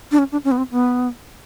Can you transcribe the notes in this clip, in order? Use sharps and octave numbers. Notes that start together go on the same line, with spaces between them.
D4
C#4
D4
C#4
B3
C4
B3